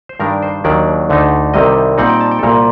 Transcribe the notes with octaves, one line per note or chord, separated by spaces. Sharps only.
C5
G2 D#3 G3 D4 A#4
C5
D#2 D#3 F#3 A#3 D4 D5
D2 D3 A3 D#4
C2 C3 D#3 G3 D#5
A#2 G3 C4 D#4 F#5
G5
A5
G5
A4
C2 A#2 G3 A#4